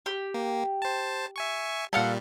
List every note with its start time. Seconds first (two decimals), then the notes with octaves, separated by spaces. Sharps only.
0.06 G4
0.34 A#3
0.82 C5 A5
1.36 E5 G#5 C#6
1.93 A#2 G3 A4 F5 F#5